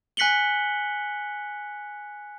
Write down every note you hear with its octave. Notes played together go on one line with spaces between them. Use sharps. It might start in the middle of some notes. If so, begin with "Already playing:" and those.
G#5 F#6 B6 C#7 F#7 G7